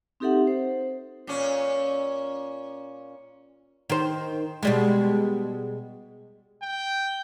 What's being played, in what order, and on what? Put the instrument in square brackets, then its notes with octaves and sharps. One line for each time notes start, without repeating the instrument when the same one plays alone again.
[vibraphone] C4 D#4 G4 A4 E5 F#5
C5
[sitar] A#2 C#4
[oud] D#3 C5
B2 G3 G#3
[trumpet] G5